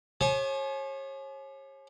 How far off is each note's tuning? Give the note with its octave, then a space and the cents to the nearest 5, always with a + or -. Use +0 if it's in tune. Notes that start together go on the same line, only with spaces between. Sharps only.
G4 +35 C#5 -35 G#5 +40